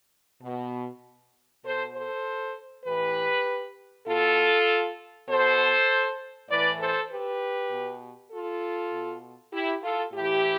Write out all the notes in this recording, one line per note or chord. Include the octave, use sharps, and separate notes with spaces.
B2
B2 A4 C5
A4 C5
A2 E3 G4 B4
B2 F4 A4
B2 A4 C5
A2 E3 B4 D5
A4 C5
G4 B4
B2
F4 A4
B2
E4 G4
F4 A4
A2 E3 E4 G4